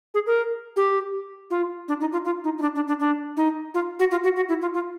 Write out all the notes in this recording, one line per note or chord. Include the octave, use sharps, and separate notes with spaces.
G#4
A#4
G4
F4
D4
D#4
F4
F4
D#4
D#4
D4
D4
D4
D4
D#4
F4
F#4
F4
F#4
F#4
E4
F4
F4